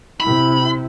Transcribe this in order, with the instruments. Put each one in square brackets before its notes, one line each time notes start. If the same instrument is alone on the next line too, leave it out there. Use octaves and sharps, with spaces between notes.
[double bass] C3 E4 [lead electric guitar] B5